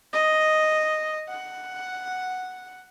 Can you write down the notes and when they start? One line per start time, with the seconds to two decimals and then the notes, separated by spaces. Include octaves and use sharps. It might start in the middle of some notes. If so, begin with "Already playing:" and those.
0.13 D#5
1.29 F#5